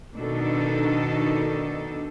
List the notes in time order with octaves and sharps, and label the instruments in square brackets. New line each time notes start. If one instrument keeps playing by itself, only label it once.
[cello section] B2 D#3 D4 D#4 A4